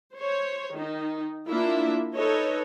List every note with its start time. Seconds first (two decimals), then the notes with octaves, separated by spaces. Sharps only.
0.13 C5 C#5
0.72 D#3 D#4
1.48 A#3 D4 E4 F4 E5
2.14 D#4 A4 B4 C#5 D#5